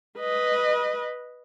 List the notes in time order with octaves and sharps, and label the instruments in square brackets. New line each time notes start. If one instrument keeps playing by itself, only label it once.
[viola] B4 D#5